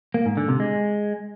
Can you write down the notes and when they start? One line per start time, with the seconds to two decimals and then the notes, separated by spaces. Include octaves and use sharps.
0.14 A#3
0.26 G#2
0.37 D3
0.48 C3
0.60 G#3